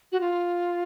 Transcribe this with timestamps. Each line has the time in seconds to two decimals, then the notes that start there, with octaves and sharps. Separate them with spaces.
0.12 F#4
0.21 F4